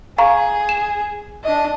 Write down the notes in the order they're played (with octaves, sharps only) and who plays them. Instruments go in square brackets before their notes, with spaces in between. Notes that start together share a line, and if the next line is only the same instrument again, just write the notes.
[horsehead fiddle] G#4 [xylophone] F5 A#5 C#6
[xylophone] E7
[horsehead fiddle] D4 D#5